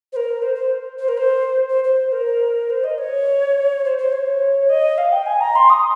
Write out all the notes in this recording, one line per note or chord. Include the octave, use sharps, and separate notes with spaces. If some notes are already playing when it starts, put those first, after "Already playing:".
C5
A#4
C5
C5
C5
A#4
C5
C5
C5
A#4
C5
D#5
C#5
C5
C5
C#5
D#5
F5
G5
G#5
A#5
C6
D#6